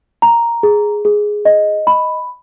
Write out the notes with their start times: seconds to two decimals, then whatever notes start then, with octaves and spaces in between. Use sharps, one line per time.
0.22 A#5
0.63 G#4
1.05 G#4
1.45 D#5
1.87 B5